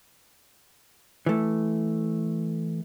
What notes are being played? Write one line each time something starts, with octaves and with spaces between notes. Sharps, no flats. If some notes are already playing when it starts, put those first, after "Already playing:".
E3 A3